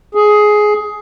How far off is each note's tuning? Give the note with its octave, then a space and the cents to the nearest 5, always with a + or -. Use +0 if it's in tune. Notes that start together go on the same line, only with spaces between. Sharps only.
G#4 +10